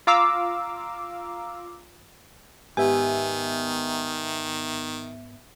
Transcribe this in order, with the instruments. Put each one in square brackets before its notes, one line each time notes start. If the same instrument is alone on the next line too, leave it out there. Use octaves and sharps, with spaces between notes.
[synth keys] F4 F5 A#5 D6 E6
[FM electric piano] G#2 B3 E5 [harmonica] D#3 [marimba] G4 [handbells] G#5